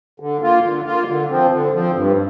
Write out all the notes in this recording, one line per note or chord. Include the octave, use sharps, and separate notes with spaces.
D3
A#3 F4
D3
A#3 F4
D3
F3 C4
D3
F3 C4
G2